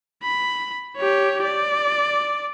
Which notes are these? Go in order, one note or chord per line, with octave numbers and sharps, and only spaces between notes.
B5
G4 C#5
D5